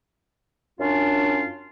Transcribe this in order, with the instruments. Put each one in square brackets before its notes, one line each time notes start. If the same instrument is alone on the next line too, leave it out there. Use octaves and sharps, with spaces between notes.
[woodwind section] F#2 C#4 D4 F4